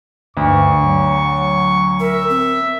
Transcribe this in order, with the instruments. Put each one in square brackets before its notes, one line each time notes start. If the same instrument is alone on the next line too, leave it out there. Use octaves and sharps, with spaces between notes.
[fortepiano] D2 [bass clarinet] G2 [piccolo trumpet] C#6
[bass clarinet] F#3
[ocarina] A#4 [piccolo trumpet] E5
[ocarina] C4